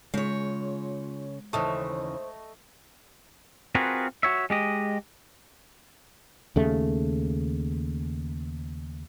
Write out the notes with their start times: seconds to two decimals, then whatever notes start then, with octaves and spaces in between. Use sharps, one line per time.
0.14 C#3 G#3 F4 C#5
1.53 D#2 C#3 E3 A3 C5 D#5
3.75 C4 F4 F#4 G#4 A#4 B4
4.23 F#4 C#5 E5
4.50 G#3 G4 D#5
6.56 D#2 C#3 A3